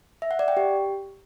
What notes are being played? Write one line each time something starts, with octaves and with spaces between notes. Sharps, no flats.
E5
F#5
D5
G5
G4